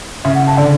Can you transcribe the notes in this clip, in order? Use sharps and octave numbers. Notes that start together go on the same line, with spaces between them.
C#3 E5
F#5
A5
D3 D5